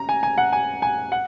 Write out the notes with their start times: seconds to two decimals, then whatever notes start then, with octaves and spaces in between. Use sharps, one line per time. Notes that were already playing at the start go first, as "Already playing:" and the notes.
Already playing: C#3 A#5
0.09 G#5
0.23 G#5
0.38 F#5
0.53 G#5
0.82 G#5
1.12 F#5